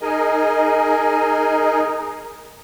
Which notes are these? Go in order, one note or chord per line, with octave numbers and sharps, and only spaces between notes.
D#4 G#4 A#4 D#5 G#5